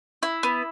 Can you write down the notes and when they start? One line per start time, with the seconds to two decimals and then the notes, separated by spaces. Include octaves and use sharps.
0.23 E4
0.43 B3